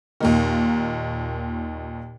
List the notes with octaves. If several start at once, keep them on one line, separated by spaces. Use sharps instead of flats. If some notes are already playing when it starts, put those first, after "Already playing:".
D#2 A#2 D#3